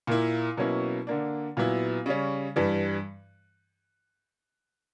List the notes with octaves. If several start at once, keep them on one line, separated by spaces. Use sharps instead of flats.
A#2 A#3 E4
B2 F#3 A#3 C#4 E4
D3 A#3 D4
A#2 F#3 B3 E4
C#3 G3 C#4
G2 E3 G3